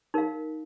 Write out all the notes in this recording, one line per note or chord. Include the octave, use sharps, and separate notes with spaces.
D#4 A#4 F5